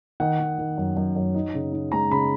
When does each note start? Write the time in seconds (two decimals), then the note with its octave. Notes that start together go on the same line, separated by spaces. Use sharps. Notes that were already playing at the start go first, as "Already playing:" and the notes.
0.20 D#3 F#5
0.39 D#3
0.58 D#3
0.78 F#2
0.97 F#2
1.16 F#2
1.34 D#4
1.54 C#3
1.73 D#4
1.92 G#3 A#5
2.11 C#3 B5